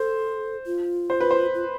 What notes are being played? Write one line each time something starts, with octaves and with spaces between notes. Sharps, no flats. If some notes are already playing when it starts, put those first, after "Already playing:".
Already playing: A4 C5
F4
C5
B4
C5
F4